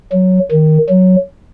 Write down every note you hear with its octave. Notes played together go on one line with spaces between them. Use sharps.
F#3
D#3
F#3